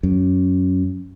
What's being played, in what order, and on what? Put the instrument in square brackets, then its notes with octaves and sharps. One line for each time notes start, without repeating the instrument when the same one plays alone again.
[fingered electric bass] F#2